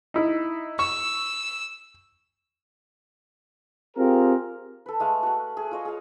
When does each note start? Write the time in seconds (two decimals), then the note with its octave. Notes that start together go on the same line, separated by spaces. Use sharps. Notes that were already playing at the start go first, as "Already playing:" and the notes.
0.14 D#4 E4
0.79 C#6 E6
3.97 C4 F4 G4 G#4 A#4
4.86 A4 B4
5.00 G#3 A3 F5 A5
5.23 F#4 F#5
5.57 G#4
5.71 F4 C#5 D#5
5.85 G#4 F5